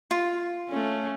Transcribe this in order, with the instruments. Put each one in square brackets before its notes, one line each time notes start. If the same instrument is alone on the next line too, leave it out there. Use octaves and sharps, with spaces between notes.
[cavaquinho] F4
[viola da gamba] A3 C#4